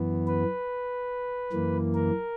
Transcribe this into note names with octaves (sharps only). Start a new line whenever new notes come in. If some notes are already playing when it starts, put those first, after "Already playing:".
Already playing: F#2 E3 B3
B4
F#2 E3 A#3
A#4